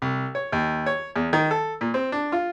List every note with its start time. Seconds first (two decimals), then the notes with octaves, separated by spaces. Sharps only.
0.02 C2
0.35 C#5
0.52 D#2
0.86 C#5
1.16 E2
1.33 D#3
1.51 A4
1.81 A#2
1.94 C4
2.12 D4
2.32 F4